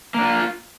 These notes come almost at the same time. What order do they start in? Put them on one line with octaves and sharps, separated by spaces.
A#3 D4 F4